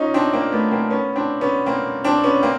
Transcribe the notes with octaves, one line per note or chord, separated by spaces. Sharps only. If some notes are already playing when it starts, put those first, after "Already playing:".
Already playing: C#4 D#4 F4
C4 D4
A#3 C4
A3 B3
A#3 C4
B3 C#4
C4 D4
B3 C#4
A#3 C4
C4 D4
B3 C#4
A#3 C4